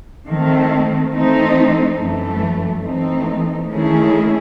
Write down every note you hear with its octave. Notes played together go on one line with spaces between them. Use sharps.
D#3 A3 C4
E3 A3 C4 D#4
F#2 E3 A3
E3 A3 C4 D#4
D#3 A3 C#4 E4 G#4